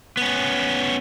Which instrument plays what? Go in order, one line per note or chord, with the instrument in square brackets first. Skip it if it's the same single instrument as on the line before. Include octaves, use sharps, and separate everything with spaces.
[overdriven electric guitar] B3 C#4